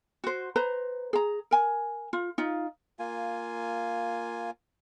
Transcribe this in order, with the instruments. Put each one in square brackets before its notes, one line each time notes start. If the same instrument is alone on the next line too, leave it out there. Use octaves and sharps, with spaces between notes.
[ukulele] F#4 C5
B4 C5 A#5
G#4 A#5
A#4 G#5
F4
D#4 F4
[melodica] A#3 F4 G#5